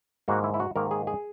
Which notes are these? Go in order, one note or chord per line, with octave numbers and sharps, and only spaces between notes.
G#2 D#3 A#3 F#4
E4
E4
F#4
G#2 D#3 A#3 A#4
G#4
G#4